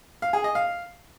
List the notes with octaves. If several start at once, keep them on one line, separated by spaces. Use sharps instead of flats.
F5
G#4
D#5
F5